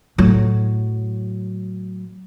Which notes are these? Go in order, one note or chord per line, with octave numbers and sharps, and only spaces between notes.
A2 F#3